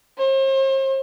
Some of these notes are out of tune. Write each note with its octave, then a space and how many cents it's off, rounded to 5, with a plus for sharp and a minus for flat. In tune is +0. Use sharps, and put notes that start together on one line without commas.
C5 +40